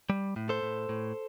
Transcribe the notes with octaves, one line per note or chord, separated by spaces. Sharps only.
G3
A2
A4 C5
A2
A2